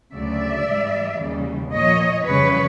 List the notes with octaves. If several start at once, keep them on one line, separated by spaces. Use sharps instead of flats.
D2 C#3 F#3 D5 E5
G#2 E3 G3
D#2 C#3 E3 G3
A#2 F3 C#5 D#5
F2 C#3 E3 G3 B4 C#5